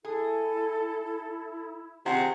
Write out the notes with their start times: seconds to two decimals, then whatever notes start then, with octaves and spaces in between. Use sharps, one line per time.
0.05 E4 G#4 A4
2.06 C3 D#3 F4 G#4 F#5